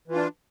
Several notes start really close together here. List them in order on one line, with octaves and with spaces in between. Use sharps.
E3 F4 D4